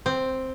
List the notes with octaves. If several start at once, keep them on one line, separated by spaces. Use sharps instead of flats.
C4